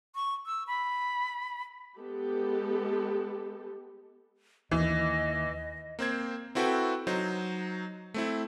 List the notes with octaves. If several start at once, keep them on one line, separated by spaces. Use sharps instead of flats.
C#6
E6
B5
G#3 B3 G4 A4
D#2 D#3 E3 D#5
A#3 C4 C5 G#6
C4 E4 F#4 A4 B4 G5
F#3 D#4 C5
A3 C4 E4